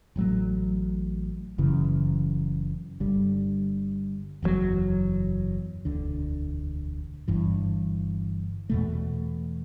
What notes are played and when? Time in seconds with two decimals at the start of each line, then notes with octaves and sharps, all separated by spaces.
0.16 A1 A2 F#3 A3
1.58 F#1 F#2 C#3 E3
3.00 G1 G2 D3 G3
4.42 F#1 E2 C#3 F#3
5.85 E1 D2 D3
7.28 G1 G2 E3
8.70 E2 B2 A3